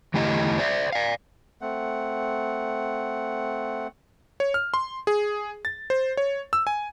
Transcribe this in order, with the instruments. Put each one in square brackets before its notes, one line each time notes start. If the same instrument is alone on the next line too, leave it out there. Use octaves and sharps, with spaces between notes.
[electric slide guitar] E2 D3 A3 E4 G4 D#5
C5 D5 E5
D5 F5
[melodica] A3 C4 F#5
[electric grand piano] C#5
F6
C6
G#4
A6
C5
C#5
E6
G#5